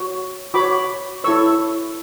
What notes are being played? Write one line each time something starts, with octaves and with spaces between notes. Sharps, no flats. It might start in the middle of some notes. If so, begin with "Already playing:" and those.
Already playing: F#4 C#5
F#4 C#5 B5 D6
E4 A4 C#5 C#6 E6